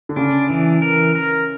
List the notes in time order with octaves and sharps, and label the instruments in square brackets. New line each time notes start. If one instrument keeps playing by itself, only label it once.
[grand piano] D3
[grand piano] C#3 [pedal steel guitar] D4
[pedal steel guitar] E3
A#4
A#4